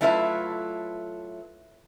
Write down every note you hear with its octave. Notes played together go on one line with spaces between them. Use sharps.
F#3 A3 E4 F4 B4 E5